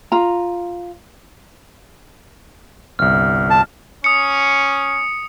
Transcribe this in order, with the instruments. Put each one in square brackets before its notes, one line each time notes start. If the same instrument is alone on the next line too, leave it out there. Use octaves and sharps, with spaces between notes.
[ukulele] F4 A#5
[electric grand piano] G1 C2 [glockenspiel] F6
[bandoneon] A5
[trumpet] C#4 [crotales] D#6 C#7